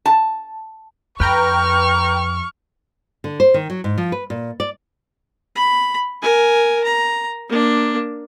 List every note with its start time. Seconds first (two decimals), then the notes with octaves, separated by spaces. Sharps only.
0.06 A5
1.20 F2 B4 G5 A#5 C#6 F6
3.24 D3
3.40 C5
3.54 D#3
3.70 F#3
3.84 G#2
3.98 F3
4.12 B4
4.30 A#2
4.60 D5
5.56 B5
6.22 A#4 G#5
6.84 A#5
7.49 A#3 D4